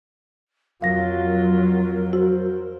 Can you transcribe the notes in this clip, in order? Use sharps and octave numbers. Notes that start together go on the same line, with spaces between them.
F2 F#3 F4 A#4 F5 A#6
F#4 C5